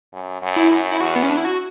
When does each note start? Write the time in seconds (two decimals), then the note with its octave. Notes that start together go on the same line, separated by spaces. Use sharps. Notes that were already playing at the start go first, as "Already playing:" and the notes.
0.13 F#2
0.42 F#2
0.56 E4
0.71 F#2
0.91 E4
1.01 E2 F#4
1.16 B3
1.23 C#4
1.30 D4
1.37 E4
1.45 F#4